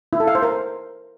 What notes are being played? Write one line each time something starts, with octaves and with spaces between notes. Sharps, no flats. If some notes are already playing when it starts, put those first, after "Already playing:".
E4
A4
F5
C5
A#4